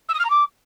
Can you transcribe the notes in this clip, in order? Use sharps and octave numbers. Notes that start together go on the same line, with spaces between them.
E6
D#6
F6
A#5
D6